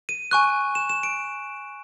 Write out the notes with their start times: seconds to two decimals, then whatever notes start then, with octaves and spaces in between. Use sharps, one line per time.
0.09 D#7
0.31 G#5 C#6 F#6
0.75 E7
0.89 E7
1.03 D7